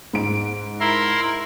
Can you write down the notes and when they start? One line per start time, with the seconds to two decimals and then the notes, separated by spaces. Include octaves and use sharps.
0.13 G#2 D7
0.80 E4 A#4 C6